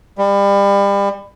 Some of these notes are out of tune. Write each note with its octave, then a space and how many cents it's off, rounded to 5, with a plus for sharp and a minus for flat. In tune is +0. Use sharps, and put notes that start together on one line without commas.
G3 +30